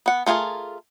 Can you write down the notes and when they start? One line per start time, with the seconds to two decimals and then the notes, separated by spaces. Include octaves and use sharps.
0.06 B3 F#5
0.26 A3 F4 F#4 G#4 A#4